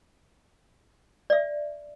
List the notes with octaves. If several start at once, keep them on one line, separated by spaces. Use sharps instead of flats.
D5 E5